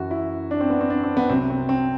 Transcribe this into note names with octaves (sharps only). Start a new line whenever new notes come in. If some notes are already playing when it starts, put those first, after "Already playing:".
Already playing: F#2 E3 F#4
E4
D4
C4
B3
C4
D4
C4
B3
C2 C3 F#3 C4
C4
C4